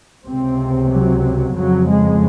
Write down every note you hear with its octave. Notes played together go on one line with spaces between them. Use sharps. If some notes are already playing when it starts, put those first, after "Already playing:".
C#2 C3 C4
F#3
F2 C#3 F#3
G#3